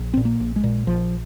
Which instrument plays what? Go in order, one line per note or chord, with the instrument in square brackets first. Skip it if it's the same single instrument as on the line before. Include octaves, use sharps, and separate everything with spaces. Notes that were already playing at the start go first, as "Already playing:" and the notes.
Already playing: [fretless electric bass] A#1
A#2 C4
A#3
A#1
G#3
A#2
A#1 F3